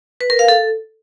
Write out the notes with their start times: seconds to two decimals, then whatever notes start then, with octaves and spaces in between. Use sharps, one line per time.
0.21 B4
0.30 A#4
0.39 F5
0.48 A4